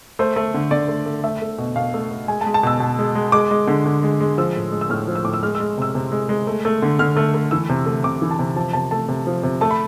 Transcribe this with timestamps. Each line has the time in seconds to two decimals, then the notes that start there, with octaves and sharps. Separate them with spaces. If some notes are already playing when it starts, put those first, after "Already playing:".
0.19 A3 C5
0.36 A3
0.54 D3
0.71 D3 D5
0.88 A3
1.06 A3
1.24 A3 E5
1.42 A3
1.58 B2
1.76 B2 F5
1.94 A3
2.11 A3
2.28 G#3 G#5
2.41 A5
2.46 G#3
2.54 A5
2.63 B2 E6
2.80 B2
2.99 G#3
3.15 G#3
3.32 G#3 D6
3.51 G#3
3.67 D3
3.86 D3
4.03 G#3
4.20 G#3
4.38 F3 E6
4.55 A2
4.72 G#3
4.81 E6
4.90 A2 F6
5.08 F3
5.16 E6
5.24 A2 D6
5.34 E6
5.43 G#3 F6
5.55 E6
5.60 G#3
5.78 C3 E6
5.95 C3
6.12 G#3
6.29 G#3
6.47 A3
6.65 A3
6.82 D3
6.99 D3 F6
7.17 A3
7.34 A3
7.51 E3 E6
7.69 C3
7.86 A3
8.04 C3 D6
8.22 E3
8.31 A5
8.39 C3
8.56 F3 A5
8.73 C3 A5
8.91 A3 A5
9.09 C3
9.27 F3
9.43 C3
9.61 A3 A5
9.71 B5